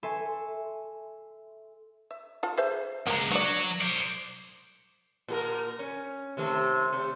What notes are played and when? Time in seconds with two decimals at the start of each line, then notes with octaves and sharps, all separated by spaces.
0.03 A4 E5 G#5 A5 C6 C#6
2.11 E5
2.43 F4 A4
2.57 G#4 C5 E5
3.07 C#2 G#3 A#3 A#5
3.31 F#3 D4 D5
3.81 C5 D5
5.28 A#2 G4 A#4
5.79 C#4
6.37 C3 D#3 A3
6.93 C3